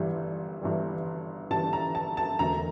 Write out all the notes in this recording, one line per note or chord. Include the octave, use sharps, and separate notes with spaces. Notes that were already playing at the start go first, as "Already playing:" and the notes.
Already playing: G1 G2 E3 G3
G1 G2 E3 G3
G1 G2 E3 G3 A5
A#5
A5
A5
E1 D2 D3 A3 A#5